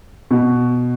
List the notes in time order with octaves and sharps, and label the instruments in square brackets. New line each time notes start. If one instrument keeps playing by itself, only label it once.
[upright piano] B2